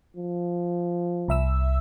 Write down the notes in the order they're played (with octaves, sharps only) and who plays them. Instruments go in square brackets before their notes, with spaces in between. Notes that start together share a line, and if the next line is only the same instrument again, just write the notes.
[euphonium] F3
[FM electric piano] C2 E5 E6